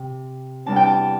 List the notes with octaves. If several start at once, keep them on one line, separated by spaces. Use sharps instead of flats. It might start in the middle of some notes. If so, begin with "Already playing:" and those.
Already playing: C3 C4
E2 C3 G3 D4 A5
G5
A5